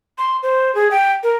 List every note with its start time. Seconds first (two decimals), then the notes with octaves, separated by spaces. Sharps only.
0.18 C6
0.43 C5
0.75 G#4
0.91 G5
1.23 A#4